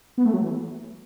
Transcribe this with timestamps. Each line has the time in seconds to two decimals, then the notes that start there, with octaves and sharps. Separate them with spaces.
0.18 B3
0.26 A3
0.34 F#3
0.42 E3